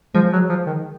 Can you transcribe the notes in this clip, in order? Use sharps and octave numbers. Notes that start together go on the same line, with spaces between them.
F3 G#3
F#3
F3
D#3